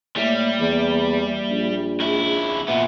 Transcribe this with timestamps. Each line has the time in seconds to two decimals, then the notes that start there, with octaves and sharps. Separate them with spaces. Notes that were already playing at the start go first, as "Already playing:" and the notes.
0.16 A2 G3 A#3 E5
0.60 E2
1.50 A#1
2.00 C#2 E4 G#4
2.68 A#2 B3 E5